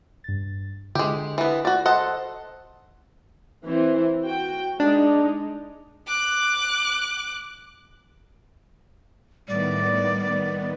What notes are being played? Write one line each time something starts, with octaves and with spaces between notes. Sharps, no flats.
G2 A6
D3 G#3 G4
E3 B3
F#4 D5
A4 C5 D#5 F#5 A5 C6
E3 C4 C5
F#4 G5
G#3 D4 D#4
D6 F#6
A2 D#3 G3 B3 D5